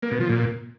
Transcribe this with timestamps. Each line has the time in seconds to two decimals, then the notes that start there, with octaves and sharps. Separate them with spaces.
0.03 A#3
0.11 B2
0.20 F3
0.29 A#2